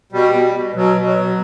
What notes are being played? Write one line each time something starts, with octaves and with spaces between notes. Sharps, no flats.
B2 G3
B2
B2
B2 F#3
B2
F#3
B2